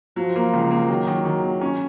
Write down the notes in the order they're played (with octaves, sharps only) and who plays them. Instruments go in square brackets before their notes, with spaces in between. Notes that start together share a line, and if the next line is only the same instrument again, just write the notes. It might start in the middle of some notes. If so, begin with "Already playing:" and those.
[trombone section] F3 [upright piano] F#3
[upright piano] A#3
C#2
A#3
[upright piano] D#3 [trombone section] F#3
[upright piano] D#3
D#3
A#3
C#4